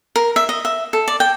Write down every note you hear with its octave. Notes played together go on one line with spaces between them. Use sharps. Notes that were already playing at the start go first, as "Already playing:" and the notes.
A#4
E5
D#5
E5
A4
D5
G5